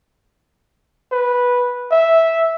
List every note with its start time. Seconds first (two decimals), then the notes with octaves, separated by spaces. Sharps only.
1.12 B4
1.92 E5